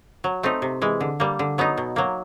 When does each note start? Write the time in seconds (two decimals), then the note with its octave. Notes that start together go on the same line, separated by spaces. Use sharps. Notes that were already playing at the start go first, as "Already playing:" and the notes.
0.24 F#3
0.43 A3 C4 D#4
0.62 C3
0.82 E3 G#3
1.01 D3
1.20 G3 A#3
1.39 D3
1.58 F#3 B3 D#4
1.78 B2
1.96 F#3 A#3